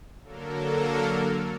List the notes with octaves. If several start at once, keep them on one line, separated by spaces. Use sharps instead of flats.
D3 F#3 A#3 A4 A#4